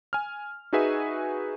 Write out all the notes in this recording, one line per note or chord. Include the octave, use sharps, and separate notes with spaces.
G#5 F6
D#4 F#4 G#4 B4 E5 G#5